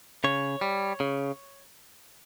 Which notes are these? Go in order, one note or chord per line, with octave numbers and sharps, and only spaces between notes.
C#3 C#5
G3
C#3